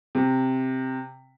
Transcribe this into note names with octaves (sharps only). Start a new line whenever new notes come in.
C3